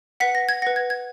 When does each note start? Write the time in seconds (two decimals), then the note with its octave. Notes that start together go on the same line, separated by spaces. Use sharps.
0.20 B4 F#5 B6
0.35 A#6
0.49 G#6
0.62 B4 F#5 A#6
0.76 G#6
0.90 G#6